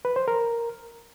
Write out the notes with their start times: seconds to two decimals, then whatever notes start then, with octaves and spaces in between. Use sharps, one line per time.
0.05 B4
0.16 C5
0.28 A#4